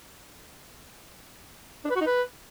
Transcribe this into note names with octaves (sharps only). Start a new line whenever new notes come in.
D4
B4
F#4
D#4
B4